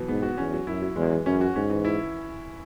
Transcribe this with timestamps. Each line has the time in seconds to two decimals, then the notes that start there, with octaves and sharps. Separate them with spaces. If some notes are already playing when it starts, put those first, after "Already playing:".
Already playing: B2 E3 F#3
0.08 G#2 B3
0.23 F#4
0.37 E2 C#4
0.53 F#3
0.67 F#2 E4
0.82 F#3
0.96 E2 G#3
1.11 E3
1.26 F#2 C#4
1.41 F#4
1.56 G#2 C#4
1.70 E3
1.85 E4